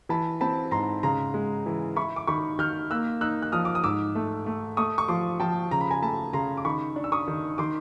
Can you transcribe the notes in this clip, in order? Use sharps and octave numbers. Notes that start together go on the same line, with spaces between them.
E3 A5 B5
C4 A5 B5
G#2 A#5 C6
C#3 A#5 C6
G#3
E3
E4 B5 C#6
D6
D#3 B5 C#6
D#3 F6 G6
A#3 E6 F#6
D#4 E6 F#6
F#6
F3 D#6 F6
D6
D#6
G#2 D6 E6
A3
A3
A3 C#6 D#6
C#6
F3 C6 D6
F3 G5 A5
C#3 A#5
B5
G#5 A#5
A3 A5 B5
C#3 A#5 C6
D6
D#3 B5 C#6
D4
E6
C#6 D#6
D#3
D#3 C6 D6